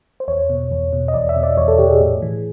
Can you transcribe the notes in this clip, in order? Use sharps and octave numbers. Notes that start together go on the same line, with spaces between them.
C5
E2 C#5
B2
E2
B2
D#5
E2 D5
E5
B2
D5
E2 C#5
A4
B2 G4
G#4
A2
E3